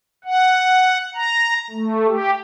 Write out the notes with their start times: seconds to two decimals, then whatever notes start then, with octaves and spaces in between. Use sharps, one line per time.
0.24 F#5
1.15 A#5
1.71 A3
2.07 G4